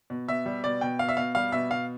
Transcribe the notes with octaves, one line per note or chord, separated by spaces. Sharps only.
B2
B2 E5
G3
B2 D5
B2 G5
B2 F5
E5
B2 F5
G3 F5
B2 E5
B2 F5